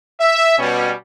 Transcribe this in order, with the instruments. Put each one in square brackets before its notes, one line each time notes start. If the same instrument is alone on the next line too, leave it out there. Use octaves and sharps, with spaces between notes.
[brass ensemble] E5
B2 G3 C#4